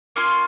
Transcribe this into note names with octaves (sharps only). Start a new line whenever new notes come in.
A#3 C#4 F4 G#5 C6